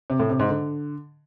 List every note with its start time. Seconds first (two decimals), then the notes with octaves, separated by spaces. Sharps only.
0.10 C3
0.20 A2
0.30 C3
0.39 G#2
0.49 D3